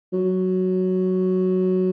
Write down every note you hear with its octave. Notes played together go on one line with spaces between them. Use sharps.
F#3